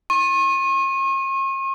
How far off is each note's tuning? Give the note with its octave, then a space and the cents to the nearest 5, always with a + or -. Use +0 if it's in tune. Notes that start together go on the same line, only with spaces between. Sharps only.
C#6 -45